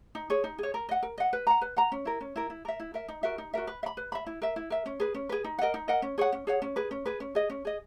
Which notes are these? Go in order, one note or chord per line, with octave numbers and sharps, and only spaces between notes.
D#4
G#4 C#5
D#4
G#4 C#5
A#4
D#5 F#5
A#4
D#5 F#5
B4
F#5 A#5
B4
F#5 A#5
C#4
E4 A#4
C#4
E4 A#4
E4
A#4 E5
E4
A#4 E5
D#4
F#4 A#4 E5
D#4
F#4 A#4 E5
B4
E5
B5
B4
E5 B5
E4
A#4 E5
E4
A#4 E5
C#4
G#4 B4
C#4
G#4 B4
D#4
A#4 D#5 F#5
D#4
A#4 D#5 F#5
C#4
G#4 C#5 F#5
C#4
G#4 C#5 F#5
C#4
G#4 B4
C#4
G#4 B4
C#4
G#4 D#5
C#4
G#4 D#5